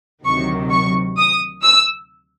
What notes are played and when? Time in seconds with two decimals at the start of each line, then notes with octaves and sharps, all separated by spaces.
0.25 D2 C3 D#3 F#3 C#6
0.71 C#6
1.18 D#6
1.63 E6